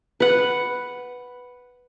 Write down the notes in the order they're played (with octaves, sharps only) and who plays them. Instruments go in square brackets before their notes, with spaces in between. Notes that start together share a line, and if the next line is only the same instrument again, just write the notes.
[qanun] B4 F#5